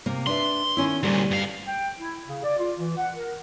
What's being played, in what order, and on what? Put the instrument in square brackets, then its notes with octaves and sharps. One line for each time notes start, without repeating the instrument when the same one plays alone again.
[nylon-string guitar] C3 A#3
[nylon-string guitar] D4 B4 E5 [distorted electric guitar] C6
[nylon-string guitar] D#3 C#4 E4
[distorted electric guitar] D2 A#2 [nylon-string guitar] G3
[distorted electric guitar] G2 F5
[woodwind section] G5
E4
C#3
D5
F4
E3
F#5
A#4